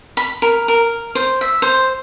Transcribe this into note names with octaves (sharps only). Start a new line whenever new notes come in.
B5
A#4
A#4
C5
E5
C5